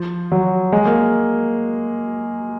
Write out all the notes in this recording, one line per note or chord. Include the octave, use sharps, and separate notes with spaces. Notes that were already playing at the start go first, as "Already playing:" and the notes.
Already playing: F3
F#3
G#3
A#3